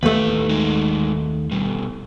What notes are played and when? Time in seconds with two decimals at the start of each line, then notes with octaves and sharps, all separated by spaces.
0.03 D#2 A2 A3 B4
0.49 G#3 D#4 F#4
1.51 B2 G3